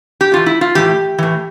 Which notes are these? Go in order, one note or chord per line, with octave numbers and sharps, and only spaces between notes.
G4
A2 E3 F4
E4
F4
A2 E3 G4
A2 E3